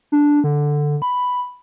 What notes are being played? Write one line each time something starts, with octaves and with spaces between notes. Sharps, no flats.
D4
D3
B5